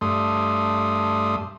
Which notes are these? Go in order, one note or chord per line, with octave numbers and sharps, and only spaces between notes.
G2 A3 C6 D#6